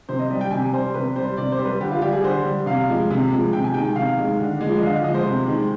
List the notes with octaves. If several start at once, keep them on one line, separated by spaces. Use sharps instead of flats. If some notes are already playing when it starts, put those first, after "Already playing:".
C3 C5
D#5
G3
G5
C3 G#5
G3 C5
C3 B4
G3 C5
C3 D5
C5
G3
B4
D3 G4
F4
G3 G4
G#4
D3 C5
G3
C3 F5
F3 G#3
C3
F3 G#3
C3 G5
G#5
D#3 G#3 G5
G5
C3 F5
D#3 G#3
D3
F3 G#3
D#5
D3 F5
D#5
F3 G#3 D#5
C5
C3
D#3 G#3